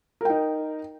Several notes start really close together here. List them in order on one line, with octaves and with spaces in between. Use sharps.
A#4 G5 D#4